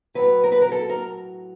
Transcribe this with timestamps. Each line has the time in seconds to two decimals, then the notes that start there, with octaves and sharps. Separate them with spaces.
0.14 A2 F#3 B4
0.44 A#4
0.52 B4
0.62 A#4
0.72 A4
0.89 A#4